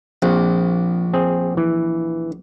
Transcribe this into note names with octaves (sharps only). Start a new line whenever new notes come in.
A#1 C4
C4 G#4
E3